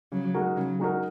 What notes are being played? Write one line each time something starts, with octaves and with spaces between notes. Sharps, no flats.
C#3 F#3
G#3 D#4 F#4 A#4
C#3 F#3
G#3 D#4 F#4 A#4